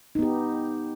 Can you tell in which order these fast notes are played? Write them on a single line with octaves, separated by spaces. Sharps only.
D#4 B3 G4